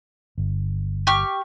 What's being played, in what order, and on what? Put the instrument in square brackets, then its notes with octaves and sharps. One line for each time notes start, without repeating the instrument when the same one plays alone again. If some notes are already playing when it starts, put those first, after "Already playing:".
[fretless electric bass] G1
[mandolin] G4 C#6 F6